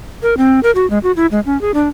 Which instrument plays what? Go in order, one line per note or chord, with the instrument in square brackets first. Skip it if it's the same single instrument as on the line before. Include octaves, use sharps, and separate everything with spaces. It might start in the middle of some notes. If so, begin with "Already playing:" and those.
[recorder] A#4
C4
A#4
F#4
G#3
F#4
E4
G#3
C#4
G#4
D4